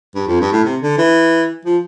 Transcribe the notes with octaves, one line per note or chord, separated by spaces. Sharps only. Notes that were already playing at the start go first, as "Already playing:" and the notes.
G2
F2
G2
A2
C3
D3
E3
F3